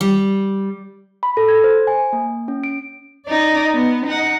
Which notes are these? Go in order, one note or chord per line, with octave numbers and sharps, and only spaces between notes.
G3
B5
A4
G#6
C5
G#5
A#3
C#4
D7
D#4 D5
B3
D#4 F#5